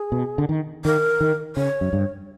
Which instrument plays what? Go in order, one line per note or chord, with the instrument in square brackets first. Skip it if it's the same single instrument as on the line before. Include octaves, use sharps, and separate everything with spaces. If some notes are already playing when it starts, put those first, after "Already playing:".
Already playing: [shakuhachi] G#4
[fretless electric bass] B2
D3
D#3
[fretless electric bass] D#3 [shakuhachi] A#4
[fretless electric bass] D#3
[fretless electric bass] C#3 [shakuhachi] C#5
[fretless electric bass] F#2
G2